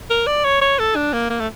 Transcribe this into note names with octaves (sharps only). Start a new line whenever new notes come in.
A#4
D5
C#5
C#5
A4
D4
A#3
A#3
A3